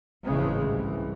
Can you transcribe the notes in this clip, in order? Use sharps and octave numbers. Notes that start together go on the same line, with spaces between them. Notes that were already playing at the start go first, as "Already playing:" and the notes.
G#1 C#2 A2 C#3 E3 G#3
C2 E3